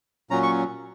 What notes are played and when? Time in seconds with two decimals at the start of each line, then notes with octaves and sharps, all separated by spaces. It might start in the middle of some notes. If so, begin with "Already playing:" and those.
0.30 A#2 F#3 C#4 A#5
0.43 C#6